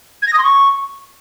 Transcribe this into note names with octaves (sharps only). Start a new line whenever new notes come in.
G#6
A#6
D#6
C6
C#6